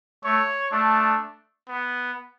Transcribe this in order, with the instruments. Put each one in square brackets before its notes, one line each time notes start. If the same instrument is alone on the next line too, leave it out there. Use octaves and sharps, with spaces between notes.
[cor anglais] A3 [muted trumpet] C#5
[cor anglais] A3 [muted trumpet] D4
[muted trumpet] B3